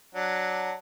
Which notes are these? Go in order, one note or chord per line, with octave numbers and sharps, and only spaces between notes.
F#3 D4